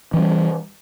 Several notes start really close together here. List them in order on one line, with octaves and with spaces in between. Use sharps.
E3 C#4 G3